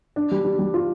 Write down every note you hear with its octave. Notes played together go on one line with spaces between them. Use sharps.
D4
G3
G3
G3
F4